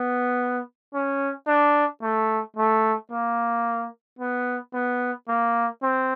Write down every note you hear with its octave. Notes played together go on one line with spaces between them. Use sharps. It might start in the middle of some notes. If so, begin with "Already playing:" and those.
Already playing: B3
C#4
D4
A3
A3
A#3
B3
B3
A#3
C4